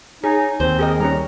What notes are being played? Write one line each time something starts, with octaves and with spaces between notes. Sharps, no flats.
D#4 G#4 C#5
D#2 C4 C5
G4 G#4 A#4 D#5
D#3 G3 C#4 A#5